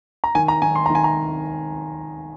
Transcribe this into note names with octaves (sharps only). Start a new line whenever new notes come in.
A#5
D#3 G#5
A#5
D#3 G#5
C6
D#3 A#5
G#5
A#5